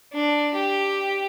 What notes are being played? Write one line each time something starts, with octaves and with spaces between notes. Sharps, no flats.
D4
G4